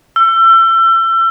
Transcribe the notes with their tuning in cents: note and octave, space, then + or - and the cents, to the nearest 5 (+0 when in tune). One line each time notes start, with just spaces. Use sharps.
E6 +35